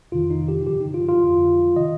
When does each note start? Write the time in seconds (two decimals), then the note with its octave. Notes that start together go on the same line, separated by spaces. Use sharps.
0.12 F2 C3 D#3 F4
0.30 D#4
0.48 G4
0.67 G2 D3 F3 G4
0.80 D#4
0.94 F4
1.08 F4
1.22 F2 D3 F3
1.76 C3 D#3 D#5